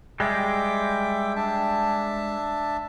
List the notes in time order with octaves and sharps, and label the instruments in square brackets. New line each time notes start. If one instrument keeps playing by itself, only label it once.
[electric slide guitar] G3 G#3 [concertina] E5 G5 D6
[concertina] D4 E5 A5